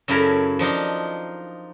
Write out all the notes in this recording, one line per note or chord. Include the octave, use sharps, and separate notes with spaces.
F#2 C#3 E4 A4 A#4
F3 D4 D#4 F4